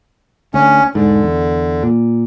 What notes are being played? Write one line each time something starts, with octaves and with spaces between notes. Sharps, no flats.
D2 C#4
E1 G#2 D3
E2
A#2